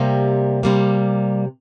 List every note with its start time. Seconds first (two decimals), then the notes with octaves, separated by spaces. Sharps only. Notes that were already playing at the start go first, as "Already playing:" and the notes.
Already playing: C3 G3 A#3
0.63 C3 G3 A#3